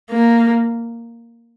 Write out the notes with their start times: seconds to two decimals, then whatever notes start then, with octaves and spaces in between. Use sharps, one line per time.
0.11 A#3